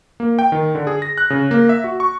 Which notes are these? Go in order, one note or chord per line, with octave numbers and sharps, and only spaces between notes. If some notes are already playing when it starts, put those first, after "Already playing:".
A#3
G5
D#3
D3
G#4
A#6
F#6
C#3
A#3
E5
F#4
C#6